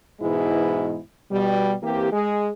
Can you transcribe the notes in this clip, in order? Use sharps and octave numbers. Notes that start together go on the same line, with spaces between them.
G#2 B2 E3 G#3 E4
B2 G3
E3 A#3 C4 G4
G#3 G#4